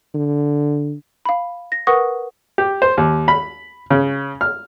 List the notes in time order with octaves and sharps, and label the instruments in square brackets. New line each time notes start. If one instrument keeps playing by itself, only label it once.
[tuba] D3
[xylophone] F5 B5
A#6
A#4 B4 F#5 C#6 D#6 A#6
[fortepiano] G4
C5
D#2
B5
C#3
F6